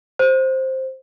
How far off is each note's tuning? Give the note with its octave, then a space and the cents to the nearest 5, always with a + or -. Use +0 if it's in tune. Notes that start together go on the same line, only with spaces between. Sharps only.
C5 +5